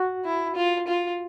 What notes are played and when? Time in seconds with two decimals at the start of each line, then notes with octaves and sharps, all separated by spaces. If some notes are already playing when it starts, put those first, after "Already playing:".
Already playing: F#4
0.25 E4
0.56 F4
0.87 F4